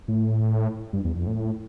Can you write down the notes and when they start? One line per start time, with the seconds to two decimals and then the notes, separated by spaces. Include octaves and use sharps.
0.08 A2
0.93 G2
1.04 E2
1.16 F2
1.27 A2